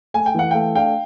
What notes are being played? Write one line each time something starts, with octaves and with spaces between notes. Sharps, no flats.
A3 G#5
G5
E3 F#5
A3 F5 G5
D4 F5 G5